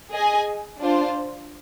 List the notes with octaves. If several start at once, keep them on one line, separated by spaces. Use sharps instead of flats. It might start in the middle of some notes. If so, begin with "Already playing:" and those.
G#4 D#5 G#5
D4 F4 C5